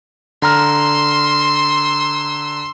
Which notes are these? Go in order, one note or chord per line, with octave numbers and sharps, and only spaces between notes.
D3 A#5 C6 E6 F6